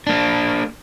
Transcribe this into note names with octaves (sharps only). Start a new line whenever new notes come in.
A#3 D4